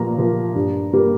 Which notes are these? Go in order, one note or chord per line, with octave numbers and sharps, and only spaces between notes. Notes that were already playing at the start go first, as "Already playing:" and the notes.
Already playing: A#2 F3 A#3 A#5
F3 A#3
G2
G3 A#3